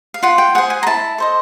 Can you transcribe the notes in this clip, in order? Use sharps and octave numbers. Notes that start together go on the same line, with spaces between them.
F5
F4 F#5
G5
G#4 C5 F#5
G#5
A#5
E4 A5
A4 C5 D#5